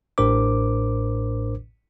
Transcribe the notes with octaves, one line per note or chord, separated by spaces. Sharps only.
A1 A2 D4 A#4 C5 D6